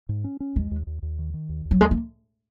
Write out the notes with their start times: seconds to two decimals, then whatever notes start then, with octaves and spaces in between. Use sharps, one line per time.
0.09 G#2
0.24 C#4
0.40 C#4
0.56 D#2 G#3
0.71 D#2
0.87 D#2
1.02 D#2
1.19 D#3
1.34 D#3
1.49 D#2
1.65 D#2
1.71 F#3
1.81 D#2 G#3
1.91 A#3